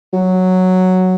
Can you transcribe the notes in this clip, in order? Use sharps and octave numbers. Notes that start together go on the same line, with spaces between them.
F#3